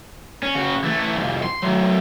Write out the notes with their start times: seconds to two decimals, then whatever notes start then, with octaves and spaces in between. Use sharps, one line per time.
0.43 C#4
0.55 C#3 F#4
0.84 E3 A3
1.16 C2 F2
1.43 C6
1.63 F#3 A3